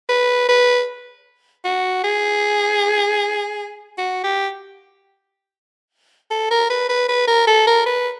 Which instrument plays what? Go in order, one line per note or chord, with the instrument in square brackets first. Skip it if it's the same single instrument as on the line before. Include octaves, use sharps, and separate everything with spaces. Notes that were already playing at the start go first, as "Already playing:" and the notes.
[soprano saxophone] B4
B4
F#4
G#4
F#4
G4
A4
A#4
B4
B4
B4
A#4
A4
A#4
B4